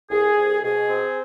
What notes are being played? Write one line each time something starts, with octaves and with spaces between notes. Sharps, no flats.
C2 G#4
C2
B2 G#4
C4